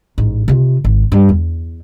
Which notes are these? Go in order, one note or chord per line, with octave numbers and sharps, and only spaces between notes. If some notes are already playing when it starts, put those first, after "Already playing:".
A1 G#2
C3 F4
G#1
G2 G3
E2